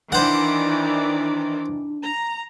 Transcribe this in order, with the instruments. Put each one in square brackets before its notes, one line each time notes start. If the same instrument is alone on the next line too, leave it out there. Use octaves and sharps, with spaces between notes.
[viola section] D#3 E3 D5 [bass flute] D4 [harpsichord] C5 F#5
[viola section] A#5